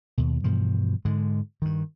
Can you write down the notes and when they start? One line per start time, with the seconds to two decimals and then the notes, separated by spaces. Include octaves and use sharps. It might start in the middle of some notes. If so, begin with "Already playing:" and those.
0.18 D#2 B2
0.44 G2 B2 E3 F3
1.05 G#2 D3 G#3
1.62 G2 D#3